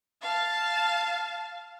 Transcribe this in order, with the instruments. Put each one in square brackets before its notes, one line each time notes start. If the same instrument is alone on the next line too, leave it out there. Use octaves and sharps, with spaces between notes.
[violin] F5 A5